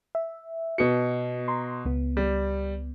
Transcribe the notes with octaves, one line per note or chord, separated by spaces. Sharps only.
E5
B2 B3 F#4 C#7
A#5 C6
C#2 B3
G3